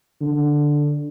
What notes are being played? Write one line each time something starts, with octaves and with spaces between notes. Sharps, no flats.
D3